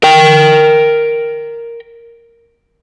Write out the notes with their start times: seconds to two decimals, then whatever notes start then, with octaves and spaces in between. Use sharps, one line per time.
0.03 A#4 G5